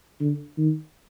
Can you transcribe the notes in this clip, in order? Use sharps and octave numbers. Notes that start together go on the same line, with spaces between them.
D3
D#3